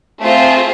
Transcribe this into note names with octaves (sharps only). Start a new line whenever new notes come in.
A3 C4 F4 G#4 C5